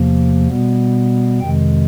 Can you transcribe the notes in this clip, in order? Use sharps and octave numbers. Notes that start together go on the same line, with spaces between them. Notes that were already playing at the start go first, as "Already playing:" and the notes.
Already playing: E2 C3 F3 A#3
B2 G3 B3
F2 C3 D#3 G#3 G5